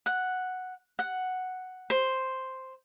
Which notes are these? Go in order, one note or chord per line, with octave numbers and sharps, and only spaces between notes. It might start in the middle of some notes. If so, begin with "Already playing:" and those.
F#5
F#5
C5